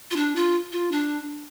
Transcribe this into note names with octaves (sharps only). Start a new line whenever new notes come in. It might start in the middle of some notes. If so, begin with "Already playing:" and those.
F4
D4
F4
F4
D4